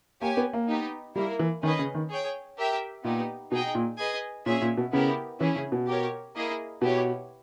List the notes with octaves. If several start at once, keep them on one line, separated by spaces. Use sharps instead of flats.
A#3 G4 C#5 G#5
B3
A#3
B3 D#4 G4
G3 A#3 E4 A#4
E3
D#3 C#4 G#4 B4 D#5
C#3
D#3
G#4 C#5 G5
G4 A#4 E5 G5
A#2 B3 D#4 G4
B2 D#4 G#4 D#5 G5
A#2
G#4 B4 D#5 G#5
A#2 C#4 G#4 C#5 E5
A#2
B2
C#3 B3 E4 G4 A#4
E3 C#4 E4 G#4
C#3
B2
G4 A#4 C#5
A#3 E4 G#4 D#5
B2 B3 E4 G4 C#5